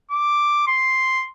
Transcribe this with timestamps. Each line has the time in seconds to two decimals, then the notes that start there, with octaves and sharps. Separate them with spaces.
0.11 D6
0.68 C6